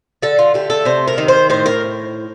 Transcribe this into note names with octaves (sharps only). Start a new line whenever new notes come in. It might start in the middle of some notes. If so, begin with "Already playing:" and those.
D3 A4
F4
A3 G4
A4
C3 C5
A#4
D#3
C5
A2 C5
A#4